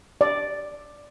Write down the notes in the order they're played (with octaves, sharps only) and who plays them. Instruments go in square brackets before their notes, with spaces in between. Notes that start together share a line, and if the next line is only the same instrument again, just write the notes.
[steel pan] D5